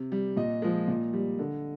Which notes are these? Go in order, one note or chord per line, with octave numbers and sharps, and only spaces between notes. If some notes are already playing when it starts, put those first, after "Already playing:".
Already playing: C3
G3
A#2 D#5
F3 G#3
A#2
G3
D3